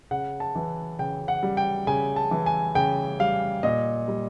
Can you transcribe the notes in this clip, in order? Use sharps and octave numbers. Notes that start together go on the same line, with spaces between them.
C#3 F#5
A5
E3
C#3 G5
F#5
G3
G5
C#3 G#5
A5
E3
G#5
C#3 G5
G3 F5
A#2 D#5
G3